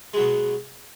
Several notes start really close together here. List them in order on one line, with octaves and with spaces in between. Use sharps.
G#3 F#3 B2